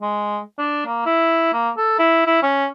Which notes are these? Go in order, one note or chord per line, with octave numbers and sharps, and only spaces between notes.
G#3
D4
A#3
E4
A#3
A4
E4
E4
C#4